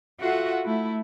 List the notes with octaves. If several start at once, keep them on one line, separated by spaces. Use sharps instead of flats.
F4 F#4 A4 E5 F#5
A3 E4